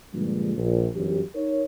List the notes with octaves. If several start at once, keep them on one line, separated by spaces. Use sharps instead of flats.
G2 A#2 D3 F3 G3 G#3
A#1
G1 F#2 E3 G4
D#4 A#4 C#5